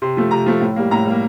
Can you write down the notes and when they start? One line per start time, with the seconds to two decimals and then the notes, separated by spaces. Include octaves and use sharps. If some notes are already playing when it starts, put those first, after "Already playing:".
0.02 C3 C6
0.17 F3 A3
0.31 C3 A#5
0.46 F3 A3
0.61 A2
0.76 G3 A#3
0.91 A2 A#5
1.06 G3 A#3